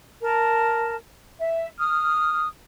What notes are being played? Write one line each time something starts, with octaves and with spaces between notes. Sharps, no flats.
A#4 A5
E5
D#6 F6